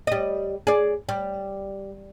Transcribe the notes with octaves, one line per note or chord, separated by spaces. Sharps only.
G3 D#5
G#4 D5
G3